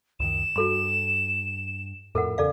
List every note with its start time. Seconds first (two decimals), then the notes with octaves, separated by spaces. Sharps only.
0.20 C#2 F#2 D#3 E7
0.56 G2 F#4 A4 C6
2.15 F2 A2 A4 A#4 F#5
2.38 E2 C#3 A4 D5 F5